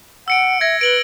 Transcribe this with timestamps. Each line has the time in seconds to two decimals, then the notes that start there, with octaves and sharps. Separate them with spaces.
0.28 F#5 E6 C#7 D7
0.61 E5 G#6 A#6
0.81 B4 D7 F#7 G7